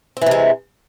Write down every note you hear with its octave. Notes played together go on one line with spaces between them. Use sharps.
C3 E3 G#3 C4